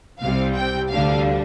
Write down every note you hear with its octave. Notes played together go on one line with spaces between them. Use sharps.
C2 C3 G3 C4 F5
G5
D2 D3 G3 D4 F5